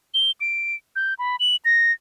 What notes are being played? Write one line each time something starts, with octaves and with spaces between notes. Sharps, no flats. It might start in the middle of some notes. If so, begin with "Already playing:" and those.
G7
D7
G6
B5
F#7
A#6